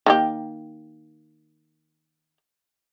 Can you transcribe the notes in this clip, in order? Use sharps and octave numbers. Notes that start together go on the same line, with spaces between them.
D#3 A#3 G4